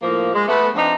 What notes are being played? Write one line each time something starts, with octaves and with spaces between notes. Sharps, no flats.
A2 F3 A#3
G#3
A3 B3
F3 C4 D4 D#4